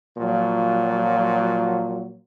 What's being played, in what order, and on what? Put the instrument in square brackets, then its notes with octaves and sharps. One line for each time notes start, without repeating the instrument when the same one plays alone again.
[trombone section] A#2 F3 F#3